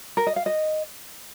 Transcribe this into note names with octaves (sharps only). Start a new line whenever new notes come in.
A#4
D#5
F5
D#5